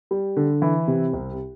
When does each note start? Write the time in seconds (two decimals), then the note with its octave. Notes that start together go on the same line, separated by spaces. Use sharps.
0.11 G3
0.37 D3
0.62 E3
0.88 C3
1.13 C2